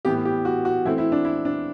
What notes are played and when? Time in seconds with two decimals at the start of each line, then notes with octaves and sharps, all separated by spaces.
0.05 A2 E3 B3 G4
0.25 G4
0.45 F#4
0.65 F#4
0.85 E3 A3 C4 E4
0.98 E4
1.12 D4
1.25 E4
1.45 D4